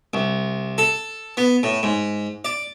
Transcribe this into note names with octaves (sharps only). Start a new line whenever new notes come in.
C2
A4
B3
A2
G#2
D5